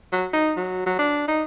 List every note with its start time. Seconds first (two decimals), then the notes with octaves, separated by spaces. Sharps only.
0.12 F#3
0.33 D#4
0.57 F#3
0.86 F#3
0.99 D4
1.28 D#4